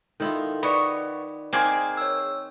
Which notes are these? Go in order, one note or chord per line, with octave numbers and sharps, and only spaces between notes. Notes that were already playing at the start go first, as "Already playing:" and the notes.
D#3 E4 F4 A4
B3 D5 D#5 B5 C#6
A#3 C4 D#4 G#4 D6
C#5 E6